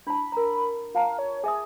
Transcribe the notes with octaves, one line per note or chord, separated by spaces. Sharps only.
D4 E4 A5 B5
A#4 A#5
F4 F5 A5 A#5
C#5
G#4 E5 G#5 D#6